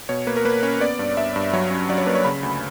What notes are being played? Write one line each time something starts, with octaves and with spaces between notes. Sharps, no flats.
B2 C#5
A#3 B4
A#4
A#3 B4
C#4 C#5
B3 D5
G2
G2 E5
G2
F#3 C#5
C#4
F#3 D5
C#5
A#3 B4
C#5
C#3 B5
D2